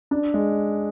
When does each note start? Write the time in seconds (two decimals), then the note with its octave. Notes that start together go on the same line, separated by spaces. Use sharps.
0.11 D4
0.34 G#3